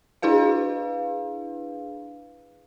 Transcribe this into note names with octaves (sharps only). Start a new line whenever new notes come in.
D4 E4 G#4 B4 F5